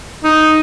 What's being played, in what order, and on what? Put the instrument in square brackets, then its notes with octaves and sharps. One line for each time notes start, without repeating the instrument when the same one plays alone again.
[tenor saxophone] D#4